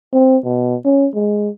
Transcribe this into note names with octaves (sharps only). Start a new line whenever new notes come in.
C4
B2
C#4
G#3